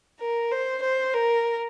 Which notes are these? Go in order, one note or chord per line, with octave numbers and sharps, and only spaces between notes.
A#4
C5
C5
A#4